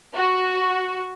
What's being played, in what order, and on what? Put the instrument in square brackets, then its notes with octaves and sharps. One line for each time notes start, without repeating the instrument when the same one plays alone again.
[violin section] F#4